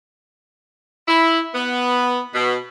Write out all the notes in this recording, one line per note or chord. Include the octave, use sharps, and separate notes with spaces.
E4
B3
B2